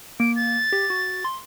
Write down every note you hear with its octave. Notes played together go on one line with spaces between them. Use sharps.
A#3 D7
A6
G4
F#4
C6